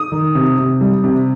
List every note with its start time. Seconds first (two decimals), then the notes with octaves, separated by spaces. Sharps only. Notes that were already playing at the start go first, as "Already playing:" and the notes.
Already playing: D#6
0.12 D#3
0.35 C3
0.58 C3
0.81 G3
1.04 C3